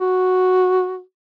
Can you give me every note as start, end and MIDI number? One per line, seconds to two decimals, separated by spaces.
0.01 1.01 66